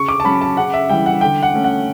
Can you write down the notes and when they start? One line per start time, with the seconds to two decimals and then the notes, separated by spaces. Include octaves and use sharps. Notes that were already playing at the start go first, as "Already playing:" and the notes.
Already playing: C#3 C#6
0.08 D6
0.20 A5
0.25 F#3 C#4 B5
0.41 A5
0.57 C#3 F#5
0.74 E5
0.89 E3 G3 G5
1.06 F#5
1.21 D3 G5
1.43 F#5
1.54 A3 C#4
1.64 F#5